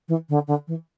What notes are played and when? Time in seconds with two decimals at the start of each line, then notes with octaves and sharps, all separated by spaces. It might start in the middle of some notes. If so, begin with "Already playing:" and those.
0.08 E3
0.29 D3
0.47 D3
0.67 E3